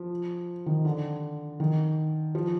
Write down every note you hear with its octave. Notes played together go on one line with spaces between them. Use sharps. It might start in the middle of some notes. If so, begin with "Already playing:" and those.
Already playing: F3
D#3
D3
D#3
F3